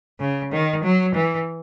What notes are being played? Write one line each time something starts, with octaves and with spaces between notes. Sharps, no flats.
C#3
D#3
F#3
E3